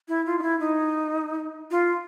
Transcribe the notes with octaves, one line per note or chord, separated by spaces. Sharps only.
E4
F4
D#4
E4
D#4
F4